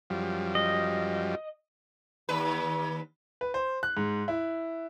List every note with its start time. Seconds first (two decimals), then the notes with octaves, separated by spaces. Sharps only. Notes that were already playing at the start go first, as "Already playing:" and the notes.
0.10 F#2 F3 G3
0.55 D#5
2.29 D#2 B4
3.41 B4
3.54 C5
3.83 F#6
3.97 G#2
4.28 E4